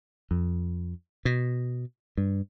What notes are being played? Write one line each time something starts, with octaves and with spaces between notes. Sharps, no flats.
F2
B2
G2